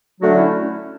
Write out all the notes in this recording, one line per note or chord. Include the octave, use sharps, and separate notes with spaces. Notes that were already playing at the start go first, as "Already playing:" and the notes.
D3 F#3 A3 D4 F#4
C#4 E4